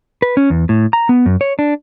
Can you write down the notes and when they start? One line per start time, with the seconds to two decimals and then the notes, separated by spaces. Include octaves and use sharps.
0.22 B4
0.37 C#4
0.50 E2
0.69 A2
0.93 A#5
1.09 B3
1.26 F#2
1.41 C#5
1.59 D4